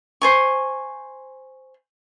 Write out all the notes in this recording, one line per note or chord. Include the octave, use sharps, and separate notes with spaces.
C5 G#5 C#6